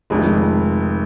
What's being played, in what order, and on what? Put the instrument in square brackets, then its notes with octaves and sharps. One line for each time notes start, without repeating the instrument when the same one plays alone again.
[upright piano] F1 F2 D#3 [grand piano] G#3